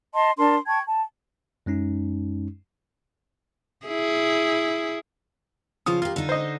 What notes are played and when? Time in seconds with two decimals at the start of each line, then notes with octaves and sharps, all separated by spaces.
0.13 D#5 A5 C6
0.38 D4 A#4 A5 C6
0.67 G5 A5 C#6 G#6
0.87 A5
1.66 F#2 G#3 C#4 D#4
3.86 E4 G#4
5.86 C#3 F3 F4 D#6
6.02 A#3 F4 G4
6.16 D3 D#4
6.29 C5 D#5